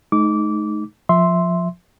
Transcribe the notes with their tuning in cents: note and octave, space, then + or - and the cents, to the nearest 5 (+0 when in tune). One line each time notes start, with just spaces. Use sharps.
A3 -45 D#4 +0 D6 -20
F3 +10 E5 +0 C6 +0